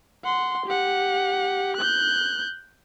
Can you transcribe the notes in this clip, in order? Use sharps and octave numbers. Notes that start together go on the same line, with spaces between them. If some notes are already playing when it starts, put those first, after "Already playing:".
F#5 C6
G4 F#5
F#6 G6